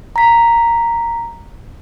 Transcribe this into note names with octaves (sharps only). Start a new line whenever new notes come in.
A#5 B6